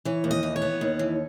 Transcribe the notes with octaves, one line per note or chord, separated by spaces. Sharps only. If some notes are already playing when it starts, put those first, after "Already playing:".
E3 C#5
D#2
D#5
E3
C#5
B3
D#2
E3